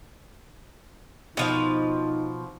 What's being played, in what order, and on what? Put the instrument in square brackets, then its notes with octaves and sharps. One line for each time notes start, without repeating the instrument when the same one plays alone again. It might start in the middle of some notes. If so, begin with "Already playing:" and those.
[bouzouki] B2 F3 F5 [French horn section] D#4